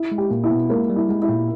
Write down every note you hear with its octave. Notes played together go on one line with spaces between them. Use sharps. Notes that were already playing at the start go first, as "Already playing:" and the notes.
Already playing: E4
G#3
G4
A#2 A#3
E4
B2 B3
G#3 A#3
G3
E4
G#3
E4
A#2 A#3